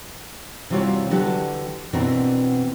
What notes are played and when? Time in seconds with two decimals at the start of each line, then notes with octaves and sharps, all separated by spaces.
0.70 C3 E3 G3 F4 F#4 C#5
1.10 D3 E3 F#3 D4 F#4 G4
1.93 B2 E3 C4 D4 F#4 A#4